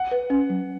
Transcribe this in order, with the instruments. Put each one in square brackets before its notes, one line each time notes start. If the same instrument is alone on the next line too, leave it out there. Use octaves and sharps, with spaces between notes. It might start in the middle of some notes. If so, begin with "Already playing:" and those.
Already playing: [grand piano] F#5
[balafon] B4
C#4
F#3